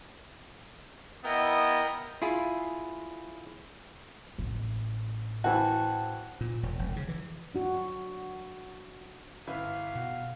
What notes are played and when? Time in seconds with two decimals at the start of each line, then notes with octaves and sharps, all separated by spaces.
1.25 B3 E4 A#4 D#5 G5
2.22 E4 F4 G#4
4.38 A1
5.44 E3 F#4 C5 G5 A5
6.41 A#2
6.63 E1
6.79 E1
6.96 C#3
7.08 E3
7.55 D4 F#4
9.47 G1 E4 B4 F5
9.95 B2 F#4